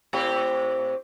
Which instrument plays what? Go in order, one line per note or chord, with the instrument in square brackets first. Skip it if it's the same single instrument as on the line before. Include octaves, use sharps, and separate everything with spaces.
[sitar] A2 C4 G4